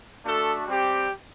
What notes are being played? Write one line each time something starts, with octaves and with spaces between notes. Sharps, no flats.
A3 D4 F#4 A4
G3 C4 G4